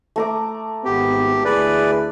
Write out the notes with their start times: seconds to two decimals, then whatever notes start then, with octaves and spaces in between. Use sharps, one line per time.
0.16 A3 A#5 D6
0.85 G#1 G#2 B3 G4
1.45 D2 E4 G#4 B4 D5